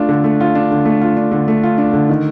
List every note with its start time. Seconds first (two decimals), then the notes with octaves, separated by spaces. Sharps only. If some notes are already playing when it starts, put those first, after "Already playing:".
Already playing: A3 D4 F4
0.09 D3
0.24 A3
0.41 F4
0.55 D4
0.71 D3
0.85 A3
1.01 F4
1.17 D4
1.32 D3
1.48 A3
1.63 F4
1.78 D4
1.93 D3
2.09 D#3